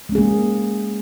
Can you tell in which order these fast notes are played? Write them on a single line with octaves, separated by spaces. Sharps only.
G#3 C#4 G#4 A#3